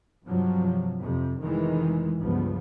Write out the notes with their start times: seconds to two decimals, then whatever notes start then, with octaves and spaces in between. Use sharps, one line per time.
0.25 G2 C3 F3 F#3
0.99 F2 C3
1.40 F1 D#3 E3 G#3
2.18 C#2 G2 F3 B3